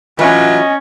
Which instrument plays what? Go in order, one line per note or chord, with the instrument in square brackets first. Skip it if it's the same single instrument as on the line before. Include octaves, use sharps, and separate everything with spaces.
[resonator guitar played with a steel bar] A2 E3 B4 [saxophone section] F#3 F4 [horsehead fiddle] C#4 [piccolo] D#5